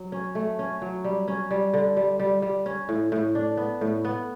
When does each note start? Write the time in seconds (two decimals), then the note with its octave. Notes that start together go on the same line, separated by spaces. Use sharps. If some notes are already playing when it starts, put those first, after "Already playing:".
Already playing: F#3
0.12 C#4
0.35 A3
0.59 C#4
0.82 F#3
1.04 G3
1.28 C#4
1.51 G3
1.74 D3
1.97 G3
2.20 G3
2.42 G3
2.66 C#4
2.89 A2
3.12 A2
3.35 D4
3.57 B3
3.81 A2
4.05 B3